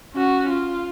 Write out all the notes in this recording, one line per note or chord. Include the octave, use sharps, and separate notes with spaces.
C#4 F#4
F4